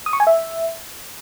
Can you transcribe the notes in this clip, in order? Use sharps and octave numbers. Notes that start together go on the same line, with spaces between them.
D#6
C#6
G#5
E5